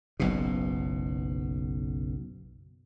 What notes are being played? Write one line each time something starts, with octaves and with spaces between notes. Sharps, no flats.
F#1 B1 B2